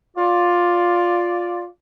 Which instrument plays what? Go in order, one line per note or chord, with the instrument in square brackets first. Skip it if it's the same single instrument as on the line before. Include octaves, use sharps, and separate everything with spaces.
[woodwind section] F4 D5